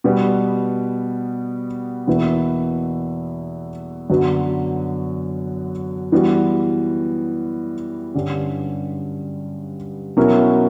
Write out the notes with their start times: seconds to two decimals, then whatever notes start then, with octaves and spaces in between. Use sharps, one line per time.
0.04 B2 G3 B3
2.07 E2 B2 A#3 E4 B4
4.10 F#2 D3 F#3 B3 F#4
6.12 E3 G3 B3 F#4
8.14 G2 D3 G3 C#4
10.17 B2 F#3 C#4 E4 A#4